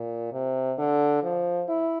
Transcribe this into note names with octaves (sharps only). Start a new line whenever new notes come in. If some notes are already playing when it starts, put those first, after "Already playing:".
Already playing: A#2
C3
D3
F3
E4